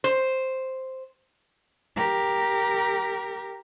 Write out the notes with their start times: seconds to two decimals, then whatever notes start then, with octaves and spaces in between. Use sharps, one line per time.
0.04 C5
1.96 G4 A#4